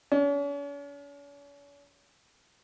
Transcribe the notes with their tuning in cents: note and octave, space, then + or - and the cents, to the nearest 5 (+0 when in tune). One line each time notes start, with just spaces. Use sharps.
C#4 +45